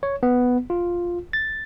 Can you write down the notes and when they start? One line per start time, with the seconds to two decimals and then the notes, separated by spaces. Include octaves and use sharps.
0.03 C#5
0.23 B3
0.70 F4
1.33 A6